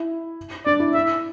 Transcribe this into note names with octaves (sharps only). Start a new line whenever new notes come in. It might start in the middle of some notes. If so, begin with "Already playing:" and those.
Already playing: E4
D4 D5
E4
E4 E5